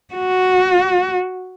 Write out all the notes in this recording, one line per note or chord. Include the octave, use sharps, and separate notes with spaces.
F#4